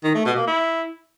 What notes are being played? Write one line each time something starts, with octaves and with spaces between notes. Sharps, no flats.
D#3
A3
B2
A#3
E4